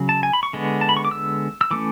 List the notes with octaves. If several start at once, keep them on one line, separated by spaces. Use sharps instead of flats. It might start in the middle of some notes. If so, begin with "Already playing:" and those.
Already playing: C#3 F#3
A5
G#5
B5
C#6
D3 G#3 B3
A5
B5
C#6
D6
E6
E6
E3 A3 C#4 D6